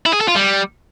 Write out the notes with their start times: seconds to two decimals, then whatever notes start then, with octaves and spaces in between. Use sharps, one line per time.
0.06 E4
0.13 G#4
0.21 A4
0.28 F4
0.36 G3